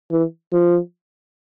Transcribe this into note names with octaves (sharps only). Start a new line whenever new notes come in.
E3
F3